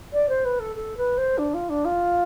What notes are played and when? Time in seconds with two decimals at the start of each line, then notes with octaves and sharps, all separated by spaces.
0.12 D5
0.28 C5
0.45 B4
0.59 A4
0.76 A4
0.97 B4
1.17 C5
1.38 D4
1.54 F4
1.69 D4
1.84 F4